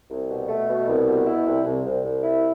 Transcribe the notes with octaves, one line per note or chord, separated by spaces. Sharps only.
C2
B2
A3
B2
C2
B2
E4
C2
C2
C2
C2
E4